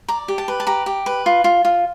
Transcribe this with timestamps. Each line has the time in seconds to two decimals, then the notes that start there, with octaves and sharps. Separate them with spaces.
0.08 D5 A#5
0.28 G4
0.38 A5
0.48 B4
0.60 A5
0.67 G4 A#5
0.86 G4
1.06 B4
1.26 F4
1.44 F4
1.65 F4